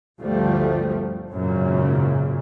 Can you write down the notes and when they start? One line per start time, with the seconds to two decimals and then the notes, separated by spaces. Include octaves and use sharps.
0.21 G1 D2 F3 G3 A3
1.31 G#1 F#2 A#2 C#3